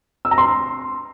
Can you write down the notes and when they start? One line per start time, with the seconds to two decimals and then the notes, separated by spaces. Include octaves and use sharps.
0.25 E6
0.31 A#5
0.38 C6